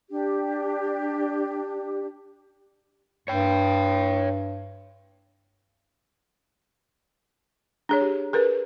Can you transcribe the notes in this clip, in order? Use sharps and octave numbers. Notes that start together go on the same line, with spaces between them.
D4 G4
G2 C#5 G5
D4 G#4 C#5
G4
G#4 A#4 B4